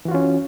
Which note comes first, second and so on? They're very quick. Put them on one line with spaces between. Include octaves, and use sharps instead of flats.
E3 F#4 F4 C#4